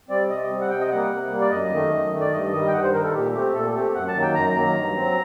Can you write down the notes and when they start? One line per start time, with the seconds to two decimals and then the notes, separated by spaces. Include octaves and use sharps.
0.09 G3 C4 D5
0.30 C3 D#5
0.50 G3 C4
0.61 F#5
0.69 C3 G5
0.81 D#5
0.90 G3 A#3 F#5
1.11 C3
1.30 G3 A#3
1.41 D5
1.51 F#2 D#5
1.72 D#3 A3
1.92 F#2
2.12 D#3 A3
2.20 D5
2.32 G2 D#5
2.52 D#3 G3 D#5
2.68 G5
2.73 G2 F#5
2.83 C5
2.93 D#3 G3 A#4
3.03 A4
3.13 A#2 G4
3.33 A3 C4 G4
3.54 A#2 A4
3.70 A4
3.75 A3 C4 G4
3.94 F#2 F#5
4.08 A5
4.15 D#3 F#3 A#3
4.22 G5
4.34 F#2 A#5
4.55 D#3 F#3 A#3 A#5
4.75 G2
4.96 F#3 C4